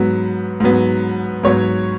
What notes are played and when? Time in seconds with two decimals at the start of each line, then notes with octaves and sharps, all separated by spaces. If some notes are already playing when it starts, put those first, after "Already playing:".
Already playing: G#2 F#3 B3
0.60 G#2 F#3 B3
1.43 G#2 F#3 B3 C#5